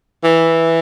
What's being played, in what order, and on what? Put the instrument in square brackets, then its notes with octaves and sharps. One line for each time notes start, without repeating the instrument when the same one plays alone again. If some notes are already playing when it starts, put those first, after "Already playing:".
[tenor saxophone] E3